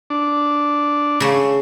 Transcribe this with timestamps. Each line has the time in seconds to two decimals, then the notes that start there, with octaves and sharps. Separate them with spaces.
0.10 D4
1.20 C#3 A3